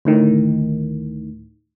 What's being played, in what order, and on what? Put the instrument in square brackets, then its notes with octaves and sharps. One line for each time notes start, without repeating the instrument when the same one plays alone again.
[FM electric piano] D2 A2 D#3